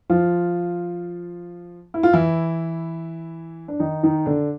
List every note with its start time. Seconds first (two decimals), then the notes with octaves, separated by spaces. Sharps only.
0.10 F3 F4
1.94 E4
2.03 F4
2.13 E3 E4
3.68 D4
3.80 D#3 D#4
4.03 D#3 D#4
4.26 D3 D4